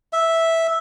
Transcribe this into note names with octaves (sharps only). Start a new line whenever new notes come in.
E5